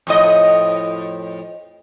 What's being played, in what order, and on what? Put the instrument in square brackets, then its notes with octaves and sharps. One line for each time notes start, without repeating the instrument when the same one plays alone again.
[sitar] F2 A2 D#5